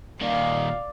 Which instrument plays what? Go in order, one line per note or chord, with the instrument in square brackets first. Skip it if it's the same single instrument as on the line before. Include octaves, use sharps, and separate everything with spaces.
[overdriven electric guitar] A#2 D#3 [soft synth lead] D5 [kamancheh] F5